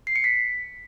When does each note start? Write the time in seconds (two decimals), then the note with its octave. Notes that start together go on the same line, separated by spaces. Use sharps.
0.07 C7
0.16 C#7
0.24 B6